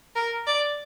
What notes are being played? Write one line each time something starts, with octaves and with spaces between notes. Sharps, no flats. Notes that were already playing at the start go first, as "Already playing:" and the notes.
A#4
D5